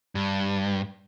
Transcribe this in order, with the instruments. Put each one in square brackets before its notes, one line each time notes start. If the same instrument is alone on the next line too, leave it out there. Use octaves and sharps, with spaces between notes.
[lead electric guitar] G2